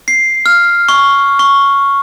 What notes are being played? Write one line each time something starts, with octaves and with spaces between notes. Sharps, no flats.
C7
F6
C#6
C#6